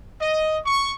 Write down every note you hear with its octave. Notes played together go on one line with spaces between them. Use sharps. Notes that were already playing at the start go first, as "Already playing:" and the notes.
D#5
C#6